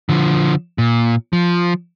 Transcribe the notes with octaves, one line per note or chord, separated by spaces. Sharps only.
D3 F3
A#2
F3